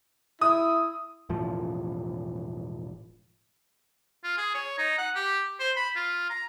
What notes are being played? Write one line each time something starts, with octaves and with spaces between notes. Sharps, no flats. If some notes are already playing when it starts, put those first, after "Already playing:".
E4 D#6
E1 A2 F3
F4
G#4
C#5
D#4
F#5
G4
C5
B5
F4
A#5